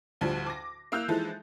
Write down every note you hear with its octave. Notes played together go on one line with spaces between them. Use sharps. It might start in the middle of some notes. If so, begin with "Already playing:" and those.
D2 A2 D3 F3 G3
D6 A#6
A#3 E4 E6 F#6 G6 F7
E3 F3 G#3 D#4 E4 A4